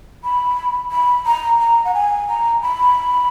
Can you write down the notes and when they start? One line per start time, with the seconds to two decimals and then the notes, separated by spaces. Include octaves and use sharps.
0.24 B5
0.92 B5
1.26 A#5
1.60 A#5
1.85 F#5
1.94 G#5
2.28 A#5
2.62 B5